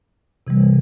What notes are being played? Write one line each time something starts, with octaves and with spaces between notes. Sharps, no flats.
C3 E3 G3